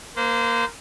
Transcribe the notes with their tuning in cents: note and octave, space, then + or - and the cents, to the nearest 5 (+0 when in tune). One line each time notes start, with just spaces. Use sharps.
A#3 +0 C5 -30